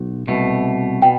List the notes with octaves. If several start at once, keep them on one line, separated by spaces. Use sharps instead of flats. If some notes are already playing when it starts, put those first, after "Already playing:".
Already playing: B1
C2 B2 A3
B2 G5